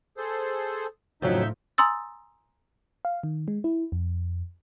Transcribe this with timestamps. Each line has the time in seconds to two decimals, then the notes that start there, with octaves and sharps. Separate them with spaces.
0.17 G#4 A4 C5
1.22 F2 A2 C#3 F3 F#3 D#4 E5 G6
1.78 G#5 A#5 C6 D#6 E6 A6
3.05 F5
3.23 D#3
3.48 G#3
3.64 E4
3.92 F2